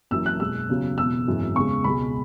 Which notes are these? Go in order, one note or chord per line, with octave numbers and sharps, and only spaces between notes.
F#1 F#2 E3 E6
F#6
E2 B2 G#3 E6
E2 C#3 F#3
E1 E2 B2 E6
G#1 F#2 E3 G#3
E2 C#3 G#3 C#6
C#2 B2 G#3 B5